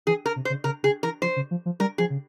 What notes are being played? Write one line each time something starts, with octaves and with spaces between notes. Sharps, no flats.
E3 G#4
A#4
C3
C5
C#3
C#3 A#4
C#3 G#4
E3 A#4
F3 C5
C#3
F3
F3
G3 A#4
F3 G#4
C#3